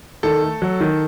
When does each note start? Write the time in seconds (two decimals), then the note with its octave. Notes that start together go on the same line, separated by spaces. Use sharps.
0.23 D#3 A4
0.43 A3
0.62 F#3
0.81 D#3